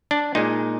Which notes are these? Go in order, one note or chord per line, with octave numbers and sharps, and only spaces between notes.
D4
A#2 G#3 D#4